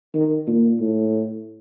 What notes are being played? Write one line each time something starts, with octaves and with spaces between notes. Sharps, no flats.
D#3
A#2
A2